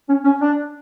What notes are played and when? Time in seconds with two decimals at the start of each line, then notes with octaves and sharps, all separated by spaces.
0.08 C#4
0.24 C#4
0.40 D4